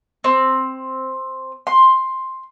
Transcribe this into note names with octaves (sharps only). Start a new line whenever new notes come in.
C4
C6